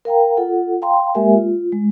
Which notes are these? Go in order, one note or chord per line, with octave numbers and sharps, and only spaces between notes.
A#4 F5 G5 A#5
F4 A4 F#5
F5 G5 A#5 C6
G#3 A#3 G4 A#4 E5 G#5
F4
G#3